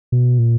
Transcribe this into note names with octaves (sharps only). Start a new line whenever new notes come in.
B2
A#2